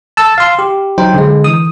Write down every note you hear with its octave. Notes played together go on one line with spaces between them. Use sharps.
A5 E6
F5 C6
G4
F#3 D#4 C5 G5
D3 G#3
E3 D#6